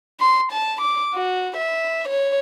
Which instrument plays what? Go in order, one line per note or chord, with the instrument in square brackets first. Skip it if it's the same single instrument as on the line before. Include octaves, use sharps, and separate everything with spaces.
[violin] C6
A5
D6
F#4
E5
C#5